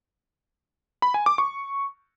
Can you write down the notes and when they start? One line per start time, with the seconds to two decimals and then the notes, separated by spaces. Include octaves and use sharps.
1.02 B5
1.14 G#5
1.26 D6
1.38 C#6